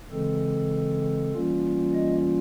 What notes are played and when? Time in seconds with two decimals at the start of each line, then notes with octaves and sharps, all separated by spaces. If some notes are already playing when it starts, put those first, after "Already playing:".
0.11 C#3 E3 G#3 C4 A4
1.33 E3 G3 A#3 C#4 F4
1.94 D#5